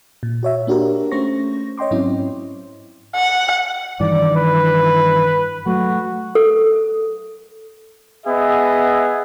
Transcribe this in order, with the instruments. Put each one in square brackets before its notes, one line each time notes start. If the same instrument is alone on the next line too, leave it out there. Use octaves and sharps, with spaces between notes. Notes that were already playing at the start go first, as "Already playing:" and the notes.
[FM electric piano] A#2
F#4 C#5 E5
A#3 D4 F#4 G4 A#4
A3 C#4 C5 C#6 A#6
C#5 D#5 G5 C6 D6
G#2 F#3 C4 C#4 E4
[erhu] F#5
[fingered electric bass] G2 D#3 E3 [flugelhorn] D5
[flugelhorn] B4
[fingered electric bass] F#3 A3 [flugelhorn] F#4
[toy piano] A4
[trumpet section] B3 G#4 D#5 E5